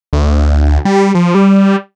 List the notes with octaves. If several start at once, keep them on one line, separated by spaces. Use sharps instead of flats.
D2
G3
F3
G3